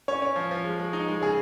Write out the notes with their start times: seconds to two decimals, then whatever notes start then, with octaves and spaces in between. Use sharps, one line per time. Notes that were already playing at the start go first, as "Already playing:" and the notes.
0.08 C#4 C#5
0.22 C#4
0.36 F3
0.51 F3
0.64 G#3
0.80 G#3
0.93 D#4
1.08 G#3
1.21 C#3 G#4